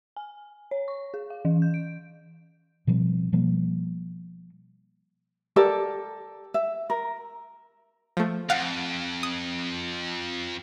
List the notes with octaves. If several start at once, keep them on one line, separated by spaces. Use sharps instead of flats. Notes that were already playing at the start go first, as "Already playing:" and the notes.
G#5
C#5
C#6
G#4
F5
E3
G6
D7
B2 F3 G3 C4
B2 F3 G3 A#3
G4 A4 A#4 D5
E5
A#4
F3 A3
F2 F5 F#5
D#6